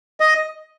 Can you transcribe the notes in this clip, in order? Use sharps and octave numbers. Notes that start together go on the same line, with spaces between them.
D#5